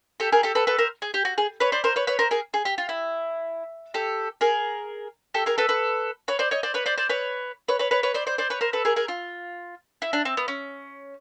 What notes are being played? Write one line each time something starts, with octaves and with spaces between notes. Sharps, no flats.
G4 A4
G#4 A#4
G4 A4
A4 B4
A4 B4
A#4 C5
G#4
G4
F#4
G#4
B4 C#5
C5 D5
A#4 C5
B4 C#5
B4 C#5
A#4 C5
G#4 A#4
G#4
G4
F4
E4
G4 A4
G#4 A#4
G4 A4
G#4 A#4
A4 B4
A4 B4
B4 C#5
C5 D5
C#5 D#5
C5 D5
B4 C#5
C5 D5
C5 D5
B4 C#5
B4 C#5
B4 C#5
B4 C#5
B4 C#5
C5 D5
C5 D5
C5 D5
B4 C#5
A#4 C5
A4 B4
G#4 A#4
G#4 A#4
F4
E4
D4
C4
B3
C#4